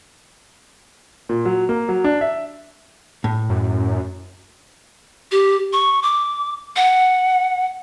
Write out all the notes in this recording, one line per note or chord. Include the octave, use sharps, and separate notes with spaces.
A#2
F#3
A#3
F#3
D4
E5
A2
F#2
G4
C#6
D6
F#5